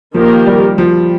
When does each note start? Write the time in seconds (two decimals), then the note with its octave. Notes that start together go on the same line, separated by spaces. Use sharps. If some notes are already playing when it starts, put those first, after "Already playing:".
0.14 D#3 F3 A#3 G4 A#4
0.47 G3
0.78 F3